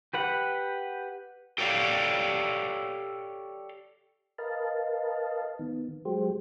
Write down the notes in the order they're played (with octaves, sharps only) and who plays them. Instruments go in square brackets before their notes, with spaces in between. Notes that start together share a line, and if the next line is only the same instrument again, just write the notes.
[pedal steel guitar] G4 B4 F#5
[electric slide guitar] G4 A4 C#5 D5 F5
[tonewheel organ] A#4 B4 D#5 F5 A5
D#3 B3
F#3 G#3 G4 C5